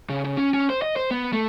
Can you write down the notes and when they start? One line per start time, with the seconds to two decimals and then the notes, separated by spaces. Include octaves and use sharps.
0.09 C#3
0.24 C#3
0.37 C#4
0.54 C#4
0.70 C5
0.82 D#5
0.96 C5
1.11 B3
1.33 A3